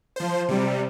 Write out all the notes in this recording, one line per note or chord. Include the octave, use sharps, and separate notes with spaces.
F3 C5
C3 G3